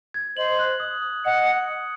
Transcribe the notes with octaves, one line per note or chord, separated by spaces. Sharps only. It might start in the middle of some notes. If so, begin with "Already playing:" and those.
G#6
C5 D#5 F#7
F#6
D#6
D#6
D#5 F#5 C#7
C#7
D#6